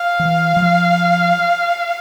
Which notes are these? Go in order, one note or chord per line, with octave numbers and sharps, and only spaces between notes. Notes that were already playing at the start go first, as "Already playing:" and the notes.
Already playing: F5
E3
F3